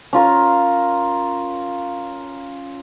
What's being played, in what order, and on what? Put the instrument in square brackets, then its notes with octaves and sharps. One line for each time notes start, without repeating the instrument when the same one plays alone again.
[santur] C#4 F4 A#4